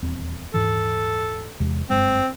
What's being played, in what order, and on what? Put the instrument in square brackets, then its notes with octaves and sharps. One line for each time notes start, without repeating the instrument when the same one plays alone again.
[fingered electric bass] D#1 E2 C4
[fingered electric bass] D#1 G#2 E3 [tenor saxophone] A4
[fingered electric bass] E2 C3 G#3
[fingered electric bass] F#1 G2 G#3 [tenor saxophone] C4